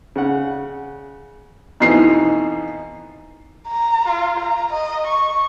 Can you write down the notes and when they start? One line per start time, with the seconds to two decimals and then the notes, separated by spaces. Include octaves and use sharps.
0.16 C#3 F#5
1.80 F2 B2 E3 D#4 C7
3.67 A#5
4.08 F4
4.40 A#5
4.73 D#5
5.07 C#6